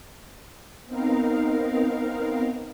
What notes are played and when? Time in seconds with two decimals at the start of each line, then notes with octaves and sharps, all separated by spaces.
0.86 B3 C4 D#4 A#4 F5